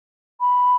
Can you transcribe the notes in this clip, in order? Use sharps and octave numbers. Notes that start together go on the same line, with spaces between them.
B5